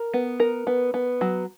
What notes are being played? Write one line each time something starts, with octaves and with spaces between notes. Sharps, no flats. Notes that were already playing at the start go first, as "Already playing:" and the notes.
Already playing: A#4
B3
A#4
B3
B3
F#3